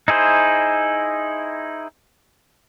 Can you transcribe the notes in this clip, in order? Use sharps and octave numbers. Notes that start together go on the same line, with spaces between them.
D#4 E4 G#4 C5